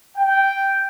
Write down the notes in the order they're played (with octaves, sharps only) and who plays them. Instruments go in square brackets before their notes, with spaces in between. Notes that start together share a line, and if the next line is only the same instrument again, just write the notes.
[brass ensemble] G5